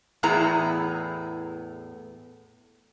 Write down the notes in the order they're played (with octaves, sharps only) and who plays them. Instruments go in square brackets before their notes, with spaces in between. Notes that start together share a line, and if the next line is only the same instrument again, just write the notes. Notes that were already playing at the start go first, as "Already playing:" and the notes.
[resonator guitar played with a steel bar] E2 A2 B3 E4 G#4 A#5